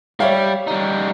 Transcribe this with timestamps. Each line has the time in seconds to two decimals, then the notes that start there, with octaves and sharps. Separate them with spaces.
0.20 G3 C#5 E5 F5
0.67 G3 D#4